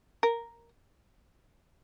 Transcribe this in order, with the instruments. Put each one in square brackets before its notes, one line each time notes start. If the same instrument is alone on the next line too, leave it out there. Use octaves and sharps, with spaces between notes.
[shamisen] A#4